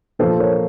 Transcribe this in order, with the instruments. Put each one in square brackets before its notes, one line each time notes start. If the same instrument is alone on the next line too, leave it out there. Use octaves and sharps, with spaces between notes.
[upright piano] A#2 F3 A4 C5
A#4 C#5